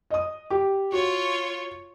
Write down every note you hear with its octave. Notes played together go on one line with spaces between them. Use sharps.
D#5 D#6
G4
F4 F#4 C#5